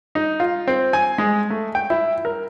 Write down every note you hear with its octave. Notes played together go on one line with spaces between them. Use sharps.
D#4
F4
C4
G#5
G#3
A3
G5
E4
A#4